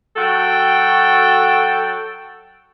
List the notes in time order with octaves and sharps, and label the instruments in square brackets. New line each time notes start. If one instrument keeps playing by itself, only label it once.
[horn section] F#3 F#4 A4 G5